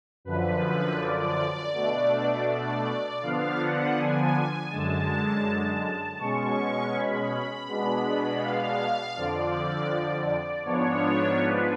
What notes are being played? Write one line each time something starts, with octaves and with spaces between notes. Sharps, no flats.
F#2 D3 F3 B4
D5
B2 A3 D4
D5
D3 F3 B3 D4 F5
F#5
G#5
F#2 D3 G#3 A5
B2 G#3 C#4 C#6
B5
B2 G#3 B3 D4
F5
F2 D3 F3 D5
G#2 F3 B3 D4 C#5
B4